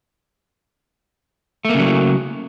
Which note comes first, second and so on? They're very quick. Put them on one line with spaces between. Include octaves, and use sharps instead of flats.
A3 A#3 C#3 F#3